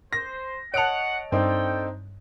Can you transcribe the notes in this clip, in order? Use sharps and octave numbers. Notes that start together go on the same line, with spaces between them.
C5 A#6
C#5 D#5 F#5 A5 D7 F7
G2 C4 D4 D#4 A4 G5